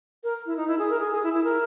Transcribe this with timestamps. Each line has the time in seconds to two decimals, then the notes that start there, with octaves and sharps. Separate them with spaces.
0.24 A#4
0.46 E4
0.57 D#4
0.68 E4
0.79 G#4
0.90 A#4
1.00 G#4
1.12 G#4
1.23 E4
1.33 E4
1.44 A#4